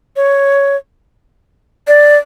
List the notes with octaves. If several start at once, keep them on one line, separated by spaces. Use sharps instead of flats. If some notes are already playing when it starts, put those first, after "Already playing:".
C#5
D5